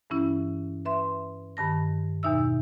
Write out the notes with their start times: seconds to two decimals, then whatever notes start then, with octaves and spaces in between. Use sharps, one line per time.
0.10 G2 E3 C#4 E4
0.85 B4 E5 C6
1.57 G2 D#3 A5 A#6
2.23 E2 B2 D#4 E5 E6